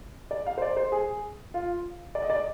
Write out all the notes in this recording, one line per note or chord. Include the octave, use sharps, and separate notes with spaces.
D5
F5
C5
D5
C5
G#4
F4
D5
D#5
D5